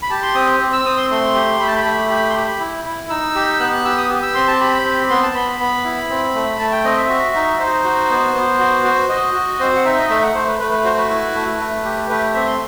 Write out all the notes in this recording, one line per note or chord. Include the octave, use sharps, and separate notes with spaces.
B5
G4 A5
C6
C4 D#6
C4
E6
C4 D#6
C6
A3 C6
G4
A3 B5
A5
B5
A3
G4 B5
C6
G4 B5
E4
E4
D#4 E6
G4
B3 F#6
F#6
G4 E6
D#6
G4
E6
C4 C6
A5
G4 B5
C4
B3 C6
A5
B3 B5
B3
E4
C4
A3
A3 A5
G5
C4 D#5
E5
F#4
D#4
D#4 C5
F#4
B3
B3
F#4
F#4
F#4 D#5
F#4
C4 C5
F#5
D#4 E5
D#5
A3 E5
F#5
A3 C5
B4
A3 B4
B4
F#4 C5
B4
E4
A3
A3
G4
A3 B4
C4 E5
C6